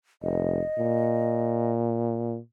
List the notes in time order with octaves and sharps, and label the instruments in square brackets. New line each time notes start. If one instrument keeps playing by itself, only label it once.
[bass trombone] F1 [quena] D#5
[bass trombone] A#2